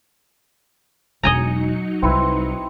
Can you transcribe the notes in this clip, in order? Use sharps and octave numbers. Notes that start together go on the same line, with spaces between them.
E1 E2 F#3 D#4 D#5 G#5 A#5 C#7
C2 C4 E4 B4